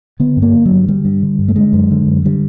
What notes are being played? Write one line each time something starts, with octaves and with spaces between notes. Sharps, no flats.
D3 B3
G2
A#3
D3
F#3
G2
D3 G3
G2
D3
G2
A3
D3 G#3
F#2
D3
F#2
D3 G3